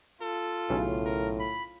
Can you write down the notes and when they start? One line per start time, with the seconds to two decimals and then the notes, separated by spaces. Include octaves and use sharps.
0.21 F4 A4
0.70 B1 A2 C#3
1.06 A#4
1.40 B5